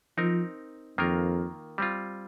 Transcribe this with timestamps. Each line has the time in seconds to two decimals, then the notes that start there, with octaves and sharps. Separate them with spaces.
0.18 F3 C4 D#4 A#4
0.98 F2 D#3 A#3 F4 A#4
1.78 G3 C4 F4